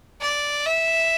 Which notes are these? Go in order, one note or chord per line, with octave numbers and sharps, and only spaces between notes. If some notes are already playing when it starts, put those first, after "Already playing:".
D5
E5